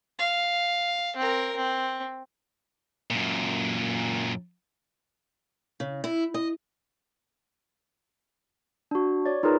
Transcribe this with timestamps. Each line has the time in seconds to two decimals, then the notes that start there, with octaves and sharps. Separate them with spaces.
0.19 F5
1.16 C4 A#4
1.56 C4
3.10 F#2 A#2
5.80 C#3
6.04 E4
6.34 D#5
8.91 D4 F#4
9.26 C#5 D5
9.43 D#4 F4 G#4 A#4 B4 A#5